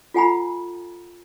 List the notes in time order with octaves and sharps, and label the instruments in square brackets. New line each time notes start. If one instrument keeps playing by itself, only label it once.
[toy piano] F4 A4 F#5 G#5 A#5 B5